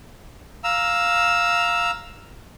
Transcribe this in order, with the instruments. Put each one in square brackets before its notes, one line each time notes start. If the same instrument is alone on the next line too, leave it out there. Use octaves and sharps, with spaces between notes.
[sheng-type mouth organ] F5 A#5 E6